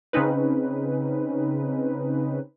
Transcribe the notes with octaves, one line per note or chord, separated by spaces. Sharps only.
C#3 C4 C#4 D#4 B4